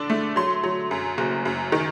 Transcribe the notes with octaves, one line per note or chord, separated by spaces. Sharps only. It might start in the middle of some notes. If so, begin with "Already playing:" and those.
Already playing: D3 D4
A3
F#3 C6
F#3
F#2
F#1
F#2
D#3